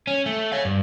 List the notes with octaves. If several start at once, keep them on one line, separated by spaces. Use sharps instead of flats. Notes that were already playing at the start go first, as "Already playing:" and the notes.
C#4
A3
C#5 F5
G2